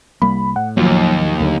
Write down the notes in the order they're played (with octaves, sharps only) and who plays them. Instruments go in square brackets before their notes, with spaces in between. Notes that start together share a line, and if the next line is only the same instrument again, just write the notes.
[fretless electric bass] C2 G3 A#3 [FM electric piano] B5
[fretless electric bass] A2 [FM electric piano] F#5
[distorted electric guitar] D#2 [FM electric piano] F3 F#3
[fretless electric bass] D2 D3 F#3